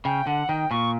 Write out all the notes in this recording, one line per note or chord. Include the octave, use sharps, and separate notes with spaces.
C#3 G5
D3 F#5
D#3 G5
A#2 C#6